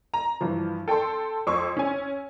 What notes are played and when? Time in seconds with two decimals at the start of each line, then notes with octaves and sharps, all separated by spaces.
0.14 A#5
0.41 G2 E3 F3
0.88 A4 G5 A5 C6
1.47 F2 C6 C#6 E6
1.77 C#4 G#5